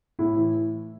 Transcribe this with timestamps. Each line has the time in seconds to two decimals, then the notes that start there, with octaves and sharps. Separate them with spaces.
0.19 A2 E4
0.36 E3